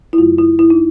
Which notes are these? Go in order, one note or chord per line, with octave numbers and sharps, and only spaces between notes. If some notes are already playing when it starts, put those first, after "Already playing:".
E4
F#2 C#3 F#3 A3 F4
E4
E4
D#4